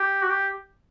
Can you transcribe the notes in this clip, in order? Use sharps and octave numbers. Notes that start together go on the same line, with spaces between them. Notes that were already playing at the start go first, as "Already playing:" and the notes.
Already playing: G4
F#4
G4